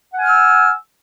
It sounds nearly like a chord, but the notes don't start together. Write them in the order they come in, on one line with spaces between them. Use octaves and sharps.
F#5 G#5 F6 E6